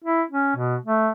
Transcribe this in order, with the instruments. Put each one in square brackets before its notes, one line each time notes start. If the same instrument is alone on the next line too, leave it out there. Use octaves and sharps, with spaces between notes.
[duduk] E4
C#4
B2
A3